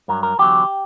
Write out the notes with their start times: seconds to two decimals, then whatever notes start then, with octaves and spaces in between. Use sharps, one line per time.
0.08 G2 F#3 A#4
0.23 A#4
0.39 E2 D3 F#3 G4